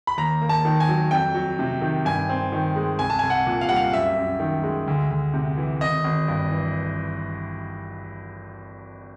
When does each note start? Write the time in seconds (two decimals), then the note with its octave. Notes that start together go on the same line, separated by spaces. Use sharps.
0.07 B5
0.17 D#2 A#5
0.42 A#3
0.49 A5
0.65 D#3
0.80 G#5
0.89 F#3
1.11 F2 G5
1.34 F#3
1.59 C3
1.81 D#3
2.05 G2 G#5
2.29 C4
2.52 D#3
2.76 G#3
2.99 C2 G#5
3.10 A5
3.19 C2 G#5
3.30 F#5
3.46 A#2
3.61 F5
3.69 G3 F#5
3.76 F5
3.93 F#2 E5
4.17 F#2
4.40 D#3
4.63 G#3
4.87 D2
5.11 D2
5.34 C3
5.57 E3
5.81 G#1 D#5
6.04 G#1
6.28 G2
6.51 E3